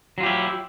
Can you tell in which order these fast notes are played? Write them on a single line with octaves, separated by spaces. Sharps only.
F#3 F4 G4 E4